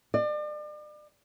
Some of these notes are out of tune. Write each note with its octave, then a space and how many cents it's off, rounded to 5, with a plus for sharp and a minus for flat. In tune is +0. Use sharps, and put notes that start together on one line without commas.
D5 +40